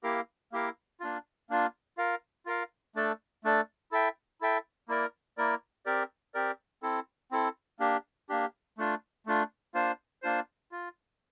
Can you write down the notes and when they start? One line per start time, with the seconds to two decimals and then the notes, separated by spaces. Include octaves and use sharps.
0.03 A#3 E4 G4 A#4 F5
0.52 A#3 E4 G4 A#4 F5
1.00 A#3 D4 F4
1.50 A#3 D4 F4
1.98 F4 A#4 F5
2.46 F4 A#4 F5
2.95 A3 D4 A4 D5
3.44 A3 D4 A4 D5
3.92 E4 A4 E5 G5
4.41 E4 A4 E5 G5
4.88 A#3 E4 A#4 D5
5.37 A#3 E4 A#4 D5
5.86 C4 G4 A#4 D5
6.34 C4 G4 A#4 D5
6.83 C4 E4 A4
7.31 C4 E4 A4
7.80 A#3 D4 G4
8.29 A#3 D4 G4
8.78 A3 D4 F4
9.26 A3 D4 F4
9.74 A#3 D4 F4 C5
10.22 A#3 D4 F4 C5
10.72 F4